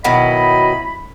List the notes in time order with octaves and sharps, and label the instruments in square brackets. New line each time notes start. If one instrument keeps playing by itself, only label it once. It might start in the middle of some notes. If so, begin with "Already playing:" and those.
[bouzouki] B2 D#3 F#3 [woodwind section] E4 B5 [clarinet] D#5